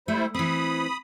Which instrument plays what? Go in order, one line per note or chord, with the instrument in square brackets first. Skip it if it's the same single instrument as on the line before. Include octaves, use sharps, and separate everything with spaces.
[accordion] G3 E4 C5 [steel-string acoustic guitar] A3
[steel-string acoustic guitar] E3 C4 [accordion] B5 D#6